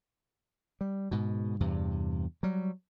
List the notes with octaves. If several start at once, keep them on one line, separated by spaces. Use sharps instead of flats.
G3
G#2 B2
E2 G2 C3
F#3 G3